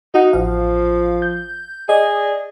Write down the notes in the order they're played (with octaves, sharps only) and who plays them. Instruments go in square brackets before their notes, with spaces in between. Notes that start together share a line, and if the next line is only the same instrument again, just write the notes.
[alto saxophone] D#4 [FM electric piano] F#4 F#5
[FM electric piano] A1 F5 [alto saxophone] F3
[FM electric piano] G6
[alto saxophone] G#4 [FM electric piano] D5 D#5